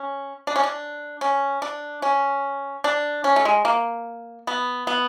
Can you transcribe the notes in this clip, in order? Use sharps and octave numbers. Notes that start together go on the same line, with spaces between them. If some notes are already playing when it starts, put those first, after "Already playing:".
Already playing: C#4
D4
C#4
D4
C#4
D4
C#4
D4
C#4
A3
G#3
A#3
B3
B3